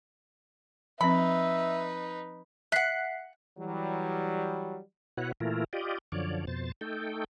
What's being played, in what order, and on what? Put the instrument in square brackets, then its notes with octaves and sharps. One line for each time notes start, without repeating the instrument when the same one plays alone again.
[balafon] F3 C4 [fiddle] D#4 B4 [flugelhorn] E5 [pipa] B5
[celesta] E5 B6 C7 [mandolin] F#5 F#6
[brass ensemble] E3 F#3 G3
[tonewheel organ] B2 E4 F#4 B4 C#5 F#5
A#2 E3 A3 E4 F4 A#4
F4 G4 D5 D#5
F#2 D3 F3 C#5 D5
F2 B2 C5 A6
A3 D#4 A4 G5